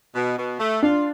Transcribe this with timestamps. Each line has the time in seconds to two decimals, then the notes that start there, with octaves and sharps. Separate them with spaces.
0.15 B2
0.38 B2
0.60 A3
0.82 D4 F4